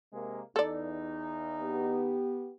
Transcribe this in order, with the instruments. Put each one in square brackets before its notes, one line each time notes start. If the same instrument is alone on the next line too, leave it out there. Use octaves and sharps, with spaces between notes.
[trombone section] C3 G#3 A#3
[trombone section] E2 D#4 [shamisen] A4 D5
[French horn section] B3 G4